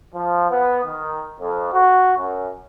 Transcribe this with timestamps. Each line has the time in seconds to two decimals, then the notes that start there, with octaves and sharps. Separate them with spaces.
0.13 F3
0.50 B3
0.84 D#3
1.39 F2
1.72 F#4
2.17 F#2